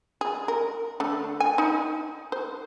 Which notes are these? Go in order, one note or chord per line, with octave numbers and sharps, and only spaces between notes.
G#4
A#4
D3 A3
G#5
D#4
C5